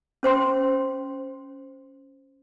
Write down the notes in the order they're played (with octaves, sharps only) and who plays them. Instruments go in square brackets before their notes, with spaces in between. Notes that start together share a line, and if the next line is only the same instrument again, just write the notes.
[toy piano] C#4 C5 G5 C6